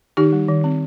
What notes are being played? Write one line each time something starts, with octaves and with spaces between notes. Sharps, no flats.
D#3 D#4 G4
G3
D#3
C4